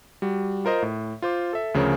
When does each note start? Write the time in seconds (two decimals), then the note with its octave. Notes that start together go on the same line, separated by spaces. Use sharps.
0.22 G3 F#4
0.65 F4 A#4 C5 D#5
0.82 A2
1.22 F4 C5 D6
1.53 A4 E5
1.74 D2 C#3 F3 A#4 C#5